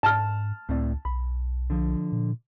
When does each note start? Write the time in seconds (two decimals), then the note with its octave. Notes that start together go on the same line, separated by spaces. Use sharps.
0.03 G#2 A5 F6
0.69 C#2 A2 C4 D5
1.05 B1 B5
1.70 D3 F3
2.12 A#2